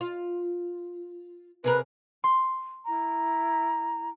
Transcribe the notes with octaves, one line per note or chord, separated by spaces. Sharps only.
F4
C3 G#4 A#4 B4
C6
E4 A#5